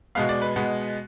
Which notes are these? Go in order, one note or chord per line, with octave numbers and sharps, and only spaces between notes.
B2 G#3 B3 F5
D5
B4
B2 G#3 B3